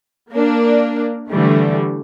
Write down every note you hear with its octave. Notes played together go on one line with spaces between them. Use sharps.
A#3 D4
D3 E3 G3 A3